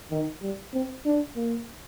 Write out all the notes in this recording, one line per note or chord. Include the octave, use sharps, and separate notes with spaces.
D#3
G3
C4
D4
A#3